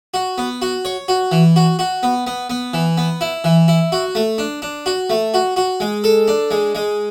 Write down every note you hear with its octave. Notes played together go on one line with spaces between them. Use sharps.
F#4
B3
F#4
C#5
F#4
E3
F#4
F#4
B3
B3
B3
E3
B3
E4
E3
E4
F#4
A3
D4
D4
F#4
A3
F#4
F#4
G#3
A4
D4
G#3
G#3